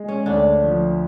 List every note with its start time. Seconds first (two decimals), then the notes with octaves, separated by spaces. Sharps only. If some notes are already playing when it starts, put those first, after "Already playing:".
Already playing: G#3
0.08 C#4
0.26 D2 D4
0.63 F3